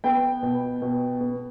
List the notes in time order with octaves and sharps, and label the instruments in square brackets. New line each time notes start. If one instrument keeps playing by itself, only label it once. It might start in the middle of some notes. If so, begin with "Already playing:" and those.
[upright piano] B3 G5
B2
B2
B3